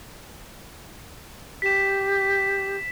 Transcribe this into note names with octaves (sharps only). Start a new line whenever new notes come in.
G4 B6 E7